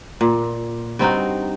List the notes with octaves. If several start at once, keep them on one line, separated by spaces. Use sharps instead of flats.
A#2
G2 C4 D#4 F#4